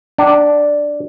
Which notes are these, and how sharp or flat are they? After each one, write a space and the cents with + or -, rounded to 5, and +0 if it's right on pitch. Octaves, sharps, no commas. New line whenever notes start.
D4 +0 G5 -45